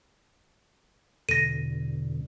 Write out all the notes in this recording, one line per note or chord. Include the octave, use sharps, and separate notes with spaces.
E2 B2 D3 A#6 D#7